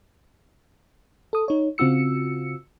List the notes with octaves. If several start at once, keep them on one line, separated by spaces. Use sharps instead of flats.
A4 D#6
D#4 C#5
C#3 C4 F4 F#4 E6 C#7